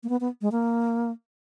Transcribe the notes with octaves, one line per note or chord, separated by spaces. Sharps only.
A#3
B3
B3
G#3
A#3